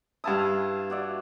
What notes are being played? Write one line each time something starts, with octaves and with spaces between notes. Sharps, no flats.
G2 E4 B4 F5 A5 D#6
F#4 D5 E5